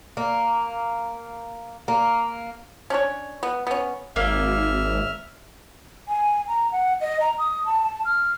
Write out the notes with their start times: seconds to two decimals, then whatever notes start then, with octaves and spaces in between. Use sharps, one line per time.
0.17 A#3
1.88 A#3
2.90 C#4 D4 C#5
3.43 B3
3.67 B3 C#4
4.16 G#1 A#3 E5 F6
6.08 G#5
6.48 A#5
6.72 F#5
7.01 D#5
7.21 A#5
7.39 D#6
7.65 A5
7.83 A5
8.05 F6